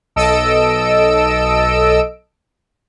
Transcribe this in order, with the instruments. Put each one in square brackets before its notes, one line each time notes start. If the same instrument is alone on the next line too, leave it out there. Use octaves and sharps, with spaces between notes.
[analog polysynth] B1 A4 D#5 E6 D7